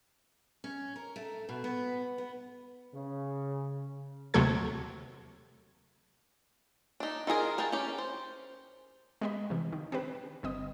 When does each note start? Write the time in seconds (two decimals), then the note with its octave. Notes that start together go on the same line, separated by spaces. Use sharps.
0.64 C#4
0.96 A#4
1.16 A3
1.49 B2
1.64 B3
2.18 B3
2.95 C#3
4.34 D#2 C3 F#3 A3 A4 G#6
7.00 D4 D#4
7.27 D#3 F4 G#4 A#4
7.58 G#4 A#4 B4 G5 A5
7.72 C#4 G4
7.98 C5
9.22 G#3 B3 G4 D#5 B5
9.50 C3 E3
9.73 D#3
9.92 C4 D4 G4 B4
10.43 G1 C4 D#5 D#6